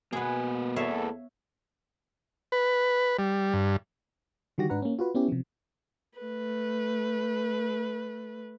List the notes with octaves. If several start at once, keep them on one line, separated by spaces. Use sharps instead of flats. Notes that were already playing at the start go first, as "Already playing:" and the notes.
B2 A#3 B3 G#4 B4
E2 A4 C#5 E5 F5
B4
G3
G2
D3 D#3 G3 F#4 G4 A#6
G#2 D4 B4 F#5 A#5
A#3 C#4
F4 F#4 B4
B3 C#4 E4 G4
C3 F3
A3 B4